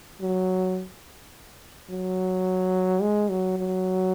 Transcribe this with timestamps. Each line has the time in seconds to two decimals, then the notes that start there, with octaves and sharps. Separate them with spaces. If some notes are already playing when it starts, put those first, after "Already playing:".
0.21 F#3
1.90 F#3
3.02 G#3
3.30 F#3
3.58 F#3